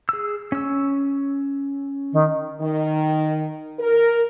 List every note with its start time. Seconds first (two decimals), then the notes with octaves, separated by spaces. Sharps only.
0.09 G#4 E6
0.52 C#4 E6
2.13 D#3
2.61 D#3
3.79 A#4